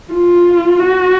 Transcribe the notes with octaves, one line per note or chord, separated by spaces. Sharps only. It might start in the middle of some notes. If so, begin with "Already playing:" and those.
F4
F#4